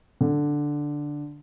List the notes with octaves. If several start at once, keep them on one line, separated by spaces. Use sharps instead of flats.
D3